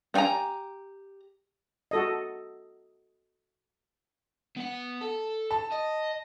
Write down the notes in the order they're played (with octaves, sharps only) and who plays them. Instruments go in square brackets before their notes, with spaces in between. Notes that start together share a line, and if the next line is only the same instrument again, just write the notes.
[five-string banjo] B3 G4 G5 G#5 A#5
[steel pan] F#4 A4 D#5
[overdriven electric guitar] B3 F#5
A4
[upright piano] A5
[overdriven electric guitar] D#5